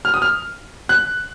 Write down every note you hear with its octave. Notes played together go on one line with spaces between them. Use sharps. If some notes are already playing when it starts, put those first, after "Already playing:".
F6
D#6
F6
F#6